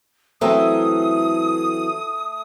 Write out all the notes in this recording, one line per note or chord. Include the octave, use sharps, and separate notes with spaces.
E3 F#3 A3 C4 A#5 D#6 E6